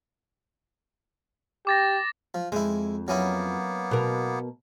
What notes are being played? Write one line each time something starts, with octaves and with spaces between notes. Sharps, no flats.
G4 D6 A6 A#6
F3
F2 G#3 E4
F#3 A#3 B3 C#4 E4
B2 A#4